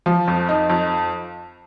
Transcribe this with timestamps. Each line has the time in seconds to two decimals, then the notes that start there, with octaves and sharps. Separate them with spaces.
0.06 F3
0.28 F2
0.49 D#4
0.70 F2